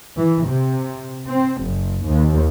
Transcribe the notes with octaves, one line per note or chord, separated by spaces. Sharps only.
E3
C3
C4
F#1
D#2